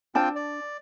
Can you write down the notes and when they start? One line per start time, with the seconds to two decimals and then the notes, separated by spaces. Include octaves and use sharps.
0.15 C4 D4 F4 G5 A5
0.36 D5